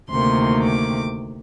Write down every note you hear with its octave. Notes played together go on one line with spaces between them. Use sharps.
D2 C3 D#3 A#3 C6
D6